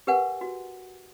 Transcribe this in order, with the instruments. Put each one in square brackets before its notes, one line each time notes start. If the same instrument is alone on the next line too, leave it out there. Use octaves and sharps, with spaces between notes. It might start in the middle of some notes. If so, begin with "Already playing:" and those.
[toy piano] G4 A#4 B4 F#5 G#5
F#4